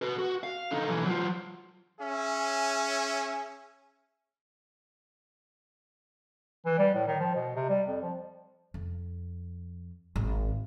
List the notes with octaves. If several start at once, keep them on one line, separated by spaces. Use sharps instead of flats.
F#4 B4
F#4
F5
D3 D#4
B1 E3
F#3 F4
C#4 G#4 E5
E3
G3
A2
D#3
F3
B2
C3
G3
F2
F3
F2
G#1